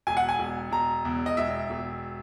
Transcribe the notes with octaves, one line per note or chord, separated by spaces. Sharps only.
E1 G#5
F#5
G#5
E1
E1 A#5
E2
D#5
E1 E5
E1